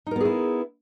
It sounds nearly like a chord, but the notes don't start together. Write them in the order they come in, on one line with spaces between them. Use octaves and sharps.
D#4 A#4 B3 G#4 E4